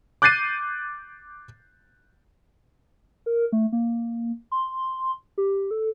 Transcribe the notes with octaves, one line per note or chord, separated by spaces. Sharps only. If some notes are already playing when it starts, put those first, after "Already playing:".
D6 F#6 G6 A6 C7 D#7
A#4
A3
A#3
C6
G4
A4